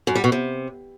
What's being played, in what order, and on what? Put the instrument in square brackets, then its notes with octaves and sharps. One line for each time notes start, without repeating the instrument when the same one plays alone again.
[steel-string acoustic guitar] F#2
G3
B2
C3